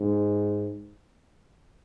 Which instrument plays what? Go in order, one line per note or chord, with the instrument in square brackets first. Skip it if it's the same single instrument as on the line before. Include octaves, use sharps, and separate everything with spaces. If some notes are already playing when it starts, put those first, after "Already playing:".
Already playing: [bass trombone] G#2